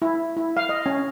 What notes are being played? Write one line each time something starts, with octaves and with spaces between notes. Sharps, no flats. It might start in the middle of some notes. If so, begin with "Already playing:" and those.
E4
E4
F5
D#5
C#4